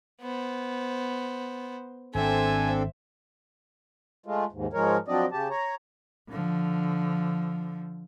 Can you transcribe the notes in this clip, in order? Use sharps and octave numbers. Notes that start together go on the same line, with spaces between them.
B3 C5
G#1 C4 D4 A4 C5 E5 G#5
G#3 A3 F4
D#2 G#2
G#2 F3 G#3 A#4 C#5
F3 F#3 C4 D4 D5 D#5
C#3 G4 A5
C#5 A#5
D3 F3